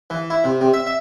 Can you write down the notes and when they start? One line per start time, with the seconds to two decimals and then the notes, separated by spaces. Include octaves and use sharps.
0.10 E3
0.30 E4
0.44 C3
0.61 C3
0.74 E5
0.87 E5